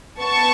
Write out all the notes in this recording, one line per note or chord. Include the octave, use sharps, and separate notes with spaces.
B3 A5 C#6